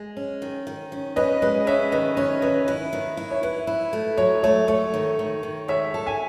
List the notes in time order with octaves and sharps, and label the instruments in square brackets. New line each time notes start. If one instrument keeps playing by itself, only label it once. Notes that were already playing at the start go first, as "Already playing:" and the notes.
Already playing: [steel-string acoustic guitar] G#3
C#4
D#3
D#3
C#4
[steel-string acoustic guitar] C#4 [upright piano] B4 D#5
[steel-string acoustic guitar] G#3 [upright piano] B4 D#5
[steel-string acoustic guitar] C#4 [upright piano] C#5 E5
[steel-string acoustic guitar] D#3 [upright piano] B4 D#5
[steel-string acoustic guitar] C#4 [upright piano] C#5
[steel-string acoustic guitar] D#3 [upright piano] B4 D#5
[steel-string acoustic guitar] E4 [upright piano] B4
[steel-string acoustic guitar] D#3
E4
[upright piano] C#5
[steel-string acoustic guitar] E4 [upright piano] B4
[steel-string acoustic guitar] E4
A3
[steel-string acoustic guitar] F#3 [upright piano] C#5
[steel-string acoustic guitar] A3 [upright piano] C#5
[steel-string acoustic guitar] A3 [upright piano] C#5
[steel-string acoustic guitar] D#3
D#3
D#3
[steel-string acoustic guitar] G#3 [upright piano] C#5 E5
[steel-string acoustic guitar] A4
[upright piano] E5 G#5